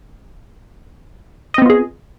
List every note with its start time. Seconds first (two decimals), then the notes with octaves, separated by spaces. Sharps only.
1.54 D#5
1.58 C4
1.62 B3
1.66 F4
1.70 G#4